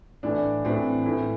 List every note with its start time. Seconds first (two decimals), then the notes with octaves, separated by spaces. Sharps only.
0.23 A2 E3 D4
0.65 A2 E3 C4
1.06 A2 E3